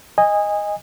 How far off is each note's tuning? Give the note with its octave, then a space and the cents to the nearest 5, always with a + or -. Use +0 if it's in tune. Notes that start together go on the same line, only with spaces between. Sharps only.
D#5 +0 G#5 -20